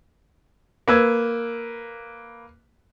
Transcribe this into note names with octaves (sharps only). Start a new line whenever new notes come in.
A#3 B4 E6 G#6